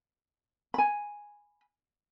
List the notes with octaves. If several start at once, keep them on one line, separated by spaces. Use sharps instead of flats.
G#5 B5